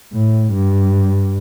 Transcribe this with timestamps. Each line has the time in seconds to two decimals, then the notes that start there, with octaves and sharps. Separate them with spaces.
0.13 A2
0.53 G2